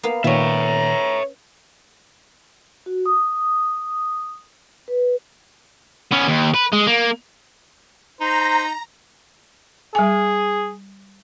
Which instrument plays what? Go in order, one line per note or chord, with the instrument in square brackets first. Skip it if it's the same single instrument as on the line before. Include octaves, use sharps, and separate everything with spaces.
[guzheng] A#3 B3 F5
[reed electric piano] A#2 D#3 [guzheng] B3 C#4 [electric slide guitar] C#5 E5 [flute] A#5
[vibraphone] F#4
D#6
B4
[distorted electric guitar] B3 C#4
D#2
B4
G#3
A#3
[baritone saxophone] D#4 [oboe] C5 [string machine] A#5
[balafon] G3 G#5 [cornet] G#4